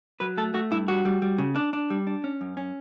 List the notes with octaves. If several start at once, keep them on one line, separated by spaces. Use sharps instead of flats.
F#3 B4
A3 A4
A3 F#4
G2 E4
G3 F#4
G3
G3
C#3
D4
D4
G3
D4
C#4
F#2
C#4